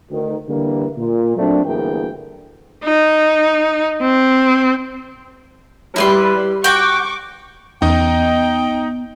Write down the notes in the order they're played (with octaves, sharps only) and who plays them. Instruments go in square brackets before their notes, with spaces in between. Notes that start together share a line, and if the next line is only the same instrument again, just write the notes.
[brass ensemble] D2 D#3
D3 E3 G3 A#3
A#2
F#3 A3 A#3 C4 D4
G1 D2 E3 A#3 G#4 G5
[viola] D#4
C4
[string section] G3 [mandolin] E4 B4 C6
[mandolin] F#4 G5 [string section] C#6 D6
[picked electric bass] E2 C#4 [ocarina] B3 [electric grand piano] D#4 D#5 [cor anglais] G5